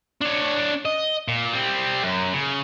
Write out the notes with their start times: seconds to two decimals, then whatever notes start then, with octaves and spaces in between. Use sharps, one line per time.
0.21 D4 C#5
0.85 D#5
1.28 A#2
1.53 G3 C4
2.03 F#2
2.33 C#3